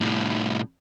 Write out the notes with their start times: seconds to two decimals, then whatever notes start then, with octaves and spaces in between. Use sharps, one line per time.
0.01 C2 A2